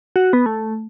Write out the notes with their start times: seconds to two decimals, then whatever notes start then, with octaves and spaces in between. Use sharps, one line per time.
0.16 F#4
0.33 B3
0.46 A3